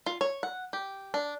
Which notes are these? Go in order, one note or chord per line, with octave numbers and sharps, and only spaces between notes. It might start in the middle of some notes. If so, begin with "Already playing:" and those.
F4
C#5
F#5
G4
D4